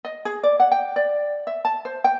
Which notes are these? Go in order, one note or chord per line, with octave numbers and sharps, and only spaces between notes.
D#5
G#4
D5
F#5
G5
D5
E5
A5
C5
G5